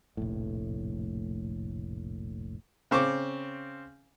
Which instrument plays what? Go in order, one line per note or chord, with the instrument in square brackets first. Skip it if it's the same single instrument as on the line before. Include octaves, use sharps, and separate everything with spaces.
[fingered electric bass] F1 A#1 A2
[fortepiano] C#3 C4 C#6 D6